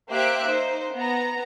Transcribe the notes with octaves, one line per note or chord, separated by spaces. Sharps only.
A#3 G4 C5 E5 F#6 D7
D#4 C5
B3 A#5